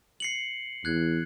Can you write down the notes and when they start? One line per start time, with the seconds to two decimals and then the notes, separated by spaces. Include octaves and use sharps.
0.20 C7 C#7 F#7
0.85 E2 F#6 G#6